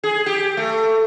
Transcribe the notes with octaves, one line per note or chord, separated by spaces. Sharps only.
G#4
G4
A3